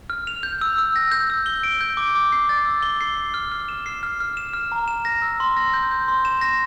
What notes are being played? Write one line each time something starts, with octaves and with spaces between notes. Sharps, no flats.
F6
F7
G6
E6
E6
A#6
G6
E6
G7
D7
G6
D6
D6
C7
A6
E6
G7
C7
C7
F6
F6
E7
C7
F6
F6
E7
F6
A#5
E7
A#6
E6
C6
A#6
G6
G6
C6
E7
A#6